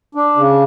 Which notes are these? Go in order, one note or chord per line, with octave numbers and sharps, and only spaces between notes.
D4
C#3